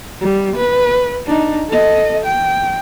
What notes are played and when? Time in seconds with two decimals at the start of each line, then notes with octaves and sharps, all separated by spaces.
0.21 G3
0.56 B4
1.27 D4 D#4
1.69 A4 D#5
2.25 G5